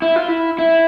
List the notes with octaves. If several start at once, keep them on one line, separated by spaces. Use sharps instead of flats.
E4
F4
E4
E4